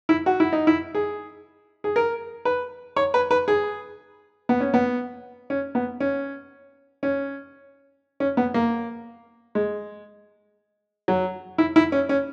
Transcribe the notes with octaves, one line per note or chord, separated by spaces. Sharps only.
E4
F#4
E4
D#4
E4
G#4
G#4
A#4
B4
C#5
B4
B4
G#4
B3
C#4
B3
C#4
B3
C#4
C#4
C#4
B3
A#3
G#3
F#3
E4
E4
C#4
C#4